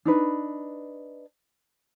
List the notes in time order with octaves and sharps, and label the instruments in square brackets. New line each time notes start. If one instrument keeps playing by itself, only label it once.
[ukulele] D4 D#4 B4